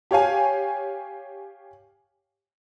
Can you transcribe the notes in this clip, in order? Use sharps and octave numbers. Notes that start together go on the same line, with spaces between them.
G4 C#5 F5 G#5